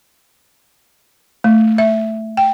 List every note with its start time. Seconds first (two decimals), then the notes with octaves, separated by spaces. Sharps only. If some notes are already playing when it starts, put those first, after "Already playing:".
1.44 A3
1.78 E5
2.37 G5